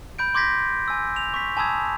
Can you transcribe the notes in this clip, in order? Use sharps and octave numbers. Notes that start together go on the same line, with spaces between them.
B5 G6 D7
C6 D6 G6 G#6 A#6 B6
G#5 E6
F7
C#6 B6
G#5 A5 B5 D#6 E6 G#6